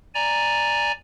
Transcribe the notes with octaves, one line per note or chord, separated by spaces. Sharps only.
D5 G#5 A#5